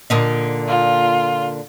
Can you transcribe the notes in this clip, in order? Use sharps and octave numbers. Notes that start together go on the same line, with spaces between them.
A#2 D3 D#4
F4